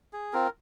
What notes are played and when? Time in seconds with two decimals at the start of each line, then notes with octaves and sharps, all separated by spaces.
0.13 G#4
0.33 C4 F4 A#4